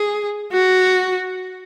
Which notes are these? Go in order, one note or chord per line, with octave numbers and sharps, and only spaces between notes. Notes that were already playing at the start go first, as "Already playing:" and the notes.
Already playing: G#4
F#4